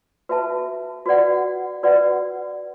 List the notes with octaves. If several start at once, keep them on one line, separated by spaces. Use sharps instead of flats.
F#4 B4 E5 A5
F#4 B4 D5 F#5
F#4 B4 D5 F#5